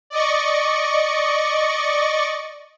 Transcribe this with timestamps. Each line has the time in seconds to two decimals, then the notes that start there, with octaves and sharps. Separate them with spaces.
0.10 D5 D#5 C#6